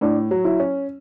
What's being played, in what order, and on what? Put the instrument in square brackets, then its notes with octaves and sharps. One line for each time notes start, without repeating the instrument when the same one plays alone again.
[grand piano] A2 [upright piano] D4
[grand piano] F#3
[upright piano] E4
[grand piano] C#4